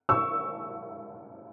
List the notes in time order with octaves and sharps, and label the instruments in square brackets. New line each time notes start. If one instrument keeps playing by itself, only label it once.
[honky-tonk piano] C#6 E6